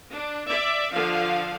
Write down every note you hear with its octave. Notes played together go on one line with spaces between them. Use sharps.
D4
D5 E5
D3 F3 F5